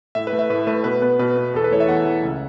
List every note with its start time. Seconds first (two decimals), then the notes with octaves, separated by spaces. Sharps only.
0.15 A2 E5
0.27 B4
0.33 A3
0.39 E5
0.50 A2 B4
0.67 A3 B4
0.84 B2 B4
1.02 B3 B4
1.19 B2 B4
1.37 B3
1.54 E2 A4
1.64 B4
1.71 E3 A3 C#5
1.80 E5
1.88 E2 F#5
2.06 E3 A3
2.23 C#2